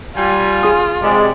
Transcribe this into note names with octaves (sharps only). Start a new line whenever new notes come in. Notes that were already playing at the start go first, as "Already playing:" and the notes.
G3 F4 G#5
G#4 D#6
C3 G#3 D5